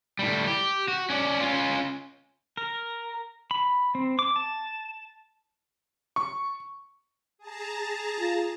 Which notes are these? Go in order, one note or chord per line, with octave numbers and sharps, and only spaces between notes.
A2 G3
G4
F#4
C#4 D5
C#4 F4
A#4
B5
C4
D6
A5
C#6
G#4 A5 A#5
F4